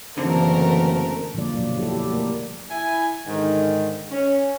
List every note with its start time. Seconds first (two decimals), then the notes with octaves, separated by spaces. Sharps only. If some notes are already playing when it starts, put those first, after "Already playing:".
0.18 F#1 D3 E3 A3 C4 A#4
1.34 D3 F3 G3 A#3 F4 D5
1.54 B2 F#3
1.77 E4 G4 A4
1.93 G4 D5
2.09 A3 A#3 A#4
2.70 E4 G#5
3.27 G#2 D3 D#3
4.11 C#4